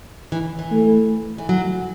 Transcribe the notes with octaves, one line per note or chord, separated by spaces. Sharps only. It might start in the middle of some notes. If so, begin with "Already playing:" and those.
E3
E3
A3
E3
F#3